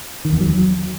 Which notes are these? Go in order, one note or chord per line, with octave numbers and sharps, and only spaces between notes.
D#3
E2
F#3